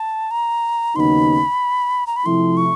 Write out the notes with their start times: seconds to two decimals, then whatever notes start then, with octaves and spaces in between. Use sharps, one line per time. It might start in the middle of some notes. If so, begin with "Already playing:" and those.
Already playing: A5
0.31 A#5
0.95 D#2 C#3 F#3 B3 D#4 B5 C6
2.07 A#5
2.16 B5
2.25 C3 F3 A3 C4 E4 C6
2.57 C#6